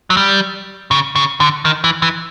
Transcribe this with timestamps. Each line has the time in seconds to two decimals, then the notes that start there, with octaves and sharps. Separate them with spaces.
0.10 F#3
0.17 G3
0.91 C#3
1.16 C#3
1.40 D3
1.65 D#3
1.84 E3
2.02 E3